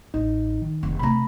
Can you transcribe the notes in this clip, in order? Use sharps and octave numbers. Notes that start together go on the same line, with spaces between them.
A1 D#4
D#3
F1
C3 A3 A#5 B5